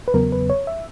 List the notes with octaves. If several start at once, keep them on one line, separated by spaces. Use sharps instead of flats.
B4
E2 C#3 F#3 B3 A#4
B4
C#5
E5